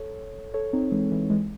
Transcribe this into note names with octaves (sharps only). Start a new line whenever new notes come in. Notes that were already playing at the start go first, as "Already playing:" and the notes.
Already playing: A4 C#5
A4 C#5
C4 D#4
E3 G#3
E3
E3 G#3